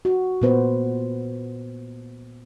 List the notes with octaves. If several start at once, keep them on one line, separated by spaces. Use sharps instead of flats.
F#4
A#2 A#3 B3 B4 C5